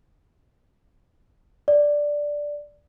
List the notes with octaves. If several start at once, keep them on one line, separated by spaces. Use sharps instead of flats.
D5